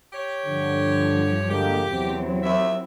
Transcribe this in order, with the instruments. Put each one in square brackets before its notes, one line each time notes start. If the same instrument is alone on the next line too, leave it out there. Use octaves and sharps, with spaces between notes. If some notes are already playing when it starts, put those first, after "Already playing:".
[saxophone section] G4 C#5
[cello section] G2 F3 [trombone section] D3
[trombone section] D3 G#3 A#3 [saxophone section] G4
[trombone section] E2 C3 [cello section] F#3 C4 E4
[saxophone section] D#2 E5